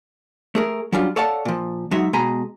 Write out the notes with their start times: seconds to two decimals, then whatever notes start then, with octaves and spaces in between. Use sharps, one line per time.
0.55 A3 G#4 A#4
0.93 F#3 G3 C#4 D4 F4
1.16 A4 C#5 D5 F5 F#5 A5
1.45 A#2 F3
1.91 F#3 G#3 D#4 F#4 E5
2.13 B2 G#3 G#4 G#5 A#5 B5